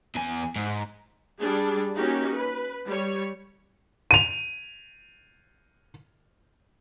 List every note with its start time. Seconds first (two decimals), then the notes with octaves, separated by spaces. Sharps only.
0.15 E2 G#5
0.56 G#2
1.39 G3 D4 G#4
1.96 A#3 C#4 D#4 F#4 G4
2.35 B4
2.86 G3 C#5
4.11 D#7 F7